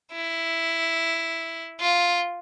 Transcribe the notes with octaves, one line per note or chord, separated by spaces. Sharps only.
E4
F4